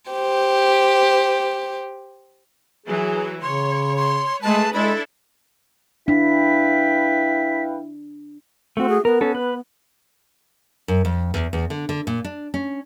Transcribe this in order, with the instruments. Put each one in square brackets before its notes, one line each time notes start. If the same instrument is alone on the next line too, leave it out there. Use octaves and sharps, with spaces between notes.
[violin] G4 C5
[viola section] E3 F#3 [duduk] G#4
[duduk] C#3 [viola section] C#5 [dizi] C6
[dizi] C6
[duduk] G#3 [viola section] A3 G#4 B4 [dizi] A5
[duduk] G#3 [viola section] D4 E4 A4 [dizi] B5
[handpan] D4 [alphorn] E4 [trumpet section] B4 F5 G5 [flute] B6
[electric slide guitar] A3 F#4 [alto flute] C4
[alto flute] G#4
[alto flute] B3 [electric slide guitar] A#4
[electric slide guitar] C#4 A4
B4
[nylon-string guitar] F#2
F2
E2
E2
D3
D3
A#2
D4
C#4